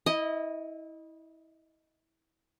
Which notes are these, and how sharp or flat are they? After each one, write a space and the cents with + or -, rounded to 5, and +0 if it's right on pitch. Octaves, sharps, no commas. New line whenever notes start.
E4 -25 D#5 +0